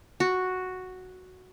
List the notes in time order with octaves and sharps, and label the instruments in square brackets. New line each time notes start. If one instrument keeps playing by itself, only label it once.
[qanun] F#4